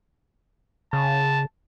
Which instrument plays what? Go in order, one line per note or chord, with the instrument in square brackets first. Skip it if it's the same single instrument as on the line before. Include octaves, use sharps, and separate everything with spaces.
[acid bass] C#3 [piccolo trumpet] A5